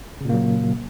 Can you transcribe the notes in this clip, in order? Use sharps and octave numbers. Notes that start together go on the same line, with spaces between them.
A#2 C#3 F#3 A#3